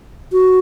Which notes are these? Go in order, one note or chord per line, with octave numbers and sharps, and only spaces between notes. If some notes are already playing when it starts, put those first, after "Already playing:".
F#4